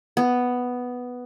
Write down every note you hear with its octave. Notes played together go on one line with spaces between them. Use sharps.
B3